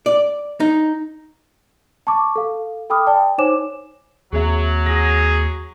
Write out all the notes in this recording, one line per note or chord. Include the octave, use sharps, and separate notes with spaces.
D5
D#4
A5 C#6 D6
A4 F5
A4 G5 B5 D6 D#6 F6
D5 G5 A5
D#4 C5 C#5 G#5 D6 E7
D#2 F#3 A#3 C4 G#4 E5
G#4 A#6